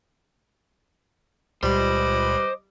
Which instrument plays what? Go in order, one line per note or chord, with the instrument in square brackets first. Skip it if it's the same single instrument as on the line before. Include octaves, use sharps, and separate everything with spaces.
[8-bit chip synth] C#2 A#2 B5 [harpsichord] G3 [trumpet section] B4 D#5 D6 [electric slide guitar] C5